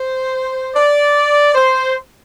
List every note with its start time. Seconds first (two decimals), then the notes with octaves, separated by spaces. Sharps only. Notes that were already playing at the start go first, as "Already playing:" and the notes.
Already playing: C5
0.76 D5
1.55 C5